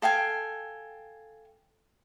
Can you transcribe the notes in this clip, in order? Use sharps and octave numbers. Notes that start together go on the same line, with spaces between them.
A4 F5 G5 G#5